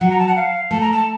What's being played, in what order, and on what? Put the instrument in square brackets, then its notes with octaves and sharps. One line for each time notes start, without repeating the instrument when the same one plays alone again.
[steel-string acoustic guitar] F#3 [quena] F#5
[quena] A#5
A5
F#5
F5
[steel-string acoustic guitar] A3 [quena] A5
[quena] A#5
A5